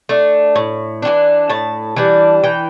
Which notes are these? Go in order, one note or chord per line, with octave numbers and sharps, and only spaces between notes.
A3 D4
A2
E3 G3 D4
A2 A5
E3 G3 D4
E3 G5